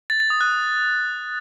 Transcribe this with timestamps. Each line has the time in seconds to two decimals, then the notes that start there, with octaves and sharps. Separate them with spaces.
0.10 A6
0.20 A6
0.30 D#6
0.41 F#6